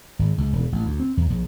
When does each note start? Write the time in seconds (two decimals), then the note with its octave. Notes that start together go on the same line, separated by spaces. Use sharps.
0.19 G#1
0.38 C#2
0.53 E1
0.72 A1
0.85 D2
1.00 C4
1.17 E2
1.30 A#1